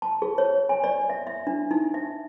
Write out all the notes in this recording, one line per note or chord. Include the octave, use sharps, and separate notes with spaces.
A5
G#4
C#5
G#5
D5
E5
E5
D4
D#4
E5